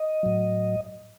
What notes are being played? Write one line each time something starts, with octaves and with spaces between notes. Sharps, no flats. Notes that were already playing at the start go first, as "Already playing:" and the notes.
Already playing: D#5
A2 F#3